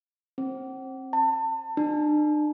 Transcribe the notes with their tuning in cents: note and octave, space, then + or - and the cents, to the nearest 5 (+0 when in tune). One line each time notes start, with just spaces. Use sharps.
C4 +30
A5 +30
D4 +40